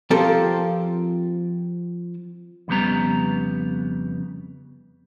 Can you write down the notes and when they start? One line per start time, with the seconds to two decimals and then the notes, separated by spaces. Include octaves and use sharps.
0.10 F3 C4 F4 G4 A4 A#4
2.68 F2 C#3 G3 B3 A#5